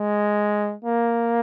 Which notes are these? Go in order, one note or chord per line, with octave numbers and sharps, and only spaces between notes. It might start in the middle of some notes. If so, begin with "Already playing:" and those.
Already playing: G#3
A#3